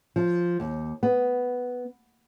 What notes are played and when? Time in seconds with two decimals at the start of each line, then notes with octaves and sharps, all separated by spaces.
0.16 F3
0.60 D#2
1.03 B3